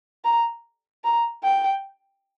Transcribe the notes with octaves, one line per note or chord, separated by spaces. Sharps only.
A#5
A#5
G5